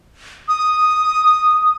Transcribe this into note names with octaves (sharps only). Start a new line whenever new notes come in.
D#6